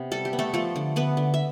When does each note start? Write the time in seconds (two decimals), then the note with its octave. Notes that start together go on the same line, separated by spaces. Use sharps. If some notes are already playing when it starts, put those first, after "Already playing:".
Already playing: C3 B3
0.12 G3 A4
0.25 G4
0.33 B3
0.39 A3 A4
0.53 F3 A3 A4
0.76 D3
0.96 D3 B3 B4
1.17 D3
1.34 E5